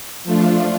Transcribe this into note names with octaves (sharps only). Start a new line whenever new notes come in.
F3 A3 D4 F4